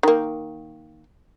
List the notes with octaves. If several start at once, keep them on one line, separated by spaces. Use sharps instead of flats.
D#3 A#3